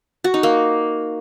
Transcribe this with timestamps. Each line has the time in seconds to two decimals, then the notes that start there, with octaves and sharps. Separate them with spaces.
0.24 F#4
0.34 D#4
0.43 A#3